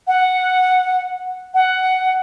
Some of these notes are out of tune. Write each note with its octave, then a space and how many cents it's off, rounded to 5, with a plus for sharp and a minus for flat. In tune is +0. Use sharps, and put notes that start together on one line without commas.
F#5 -5
F#5 +10